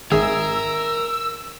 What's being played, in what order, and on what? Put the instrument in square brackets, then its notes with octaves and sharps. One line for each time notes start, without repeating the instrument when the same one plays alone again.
[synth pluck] G#1 D#3 [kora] G#4 E5 [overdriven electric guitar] A#4 [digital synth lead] E6